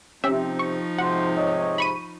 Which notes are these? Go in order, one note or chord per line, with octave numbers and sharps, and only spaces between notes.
C3 F3 C4 C#4 D#4 G4 E5
C#6
G#2 C3 F#4 C5 F#5
C#5 D#5
B5 C#6 D#7